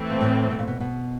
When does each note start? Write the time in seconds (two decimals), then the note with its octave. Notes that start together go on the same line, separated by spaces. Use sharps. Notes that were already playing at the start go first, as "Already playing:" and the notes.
Already playing: E3 A3 C4
0.10 A#2
0.21 A2
0.51 B2
0.59 A#2
0.68 B2
0.80 B2